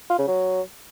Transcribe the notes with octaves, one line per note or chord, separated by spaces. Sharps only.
F4
C#3
F#3